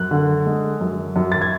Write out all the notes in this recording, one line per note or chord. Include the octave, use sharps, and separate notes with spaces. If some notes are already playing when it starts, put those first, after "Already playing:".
Already playing: F#2 F#6
D3
G#3
F#2
F#2
A6
G#6